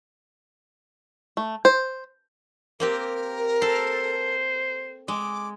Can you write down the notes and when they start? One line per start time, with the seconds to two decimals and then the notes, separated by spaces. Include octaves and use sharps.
1.37 A3
1.65 C5
2.80 A#3 C4 G4 A#4
3.62 A4 C5
5.08 G#3 D6